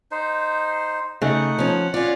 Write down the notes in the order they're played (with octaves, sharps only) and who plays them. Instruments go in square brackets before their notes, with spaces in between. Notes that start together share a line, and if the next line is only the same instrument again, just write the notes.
[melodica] D#4 C5
[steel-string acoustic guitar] C#3 [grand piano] A3 D#4 [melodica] F#5
[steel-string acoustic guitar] F3 C#4
[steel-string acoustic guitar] C#4 F4 [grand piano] D5